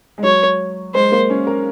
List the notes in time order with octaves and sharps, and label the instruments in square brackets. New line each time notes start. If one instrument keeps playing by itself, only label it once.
[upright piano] G#3
[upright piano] F#3 [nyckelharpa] C#5
[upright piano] G#3 [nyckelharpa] C5
[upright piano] A#3
C#4
A#4